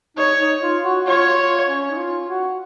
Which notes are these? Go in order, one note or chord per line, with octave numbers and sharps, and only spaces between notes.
D#4 C#5
D#4
F4
F#4
F4 C#5
F4
C#4
D#4
F4
F#4